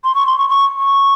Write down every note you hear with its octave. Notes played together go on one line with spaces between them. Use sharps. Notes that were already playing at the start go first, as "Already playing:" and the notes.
C6
C#6
C6
C#6
C#6
C#6